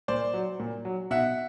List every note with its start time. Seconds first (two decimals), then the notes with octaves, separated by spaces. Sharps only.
0.08 A#2 C5 D5
0.34 F#3
0.60 A#2
0.85 F#3
1.11 B2 E5 F#5